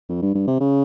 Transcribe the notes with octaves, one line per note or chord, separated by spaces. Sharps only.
F2
G2
G2
C3
C#3